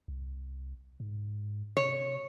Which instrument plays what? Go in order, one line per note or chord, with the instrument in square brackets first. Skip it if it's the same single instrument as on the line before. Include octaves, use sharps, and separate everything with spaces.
[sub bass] C2
G#2
[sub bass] C3 [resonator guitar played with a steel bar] C#5